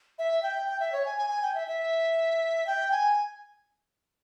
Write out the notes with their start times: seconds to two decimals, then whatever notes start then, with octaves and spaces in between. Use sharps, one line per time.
0.19 E5
0.43 G5
0.68 G5
0.80 E5
0.93 C#5
1.05 G#5
1.18 G#5
1.30 G#5
1.42 G5
1.55 E5
1.67 E5
2.67 G5
2.91 G#5